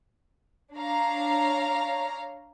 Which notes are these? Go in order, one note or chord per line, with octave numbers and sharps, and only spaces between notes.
D4 C#5 F5 A#5